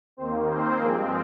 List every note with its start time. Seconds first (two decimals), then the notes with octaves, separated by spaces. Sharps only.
0.17 D#2 D#3 A#3 C4 C5
0.47 C4 C5
0.77 G2 F3 G#3 A#3 C4 A#4